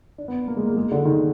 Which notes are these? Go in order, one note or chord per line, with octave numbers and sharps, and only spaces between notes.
D4
B3
A#3
G#3
A#3
G#3
D3
D#3